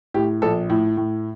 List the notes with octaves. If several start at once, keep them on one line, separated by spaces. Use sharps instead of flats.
A2 G4
A#1 A4
A2
A2